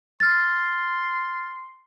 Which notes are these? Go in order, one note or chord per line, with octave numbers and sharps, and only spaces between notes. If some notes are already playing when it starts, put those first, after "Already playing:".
C6 F6 A6